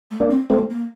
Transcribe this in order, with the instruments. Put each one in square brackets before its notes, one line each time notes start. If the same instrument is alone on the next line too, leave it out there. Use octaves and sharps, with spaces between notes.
[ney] A3
[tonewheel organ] A#3 D4
[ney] C4
[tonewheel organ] A3 C4 [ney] A#3
[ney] A#3